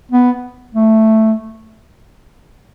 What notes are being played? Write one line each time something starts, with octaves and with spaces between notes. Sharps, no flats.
B3
A3